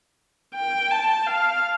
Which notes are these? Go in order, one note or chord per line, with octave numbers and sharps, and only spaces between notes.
G5
A5
F5